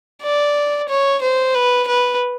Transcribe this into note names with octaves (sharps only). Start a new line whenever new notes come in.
D5
C#5
C5
B4
B4